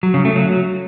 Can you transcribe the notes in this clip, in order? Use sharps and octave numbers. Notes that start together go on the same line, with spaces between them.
F#3
C#3
A3
F#3